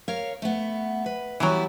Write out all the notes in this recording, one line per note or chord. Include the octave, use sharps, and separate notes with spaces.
A#4 C#5 F5
A3 B3
B4
E3 F#3 G3 B3 E4